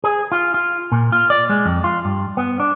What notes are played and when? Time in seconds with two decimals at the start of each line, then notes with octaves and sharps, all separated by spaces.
0.04 G#4
0.32 F4
0.54 F4
0.92 A#2
1.12 F4
1.30 D5
1.50 G#3
1.65 F2
1.84 F4
2.05 G2
2.37 B3
2.60 D4